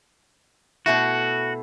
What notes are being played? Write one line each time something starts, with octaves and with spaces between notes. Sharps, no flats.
B2 A3 E4 F#4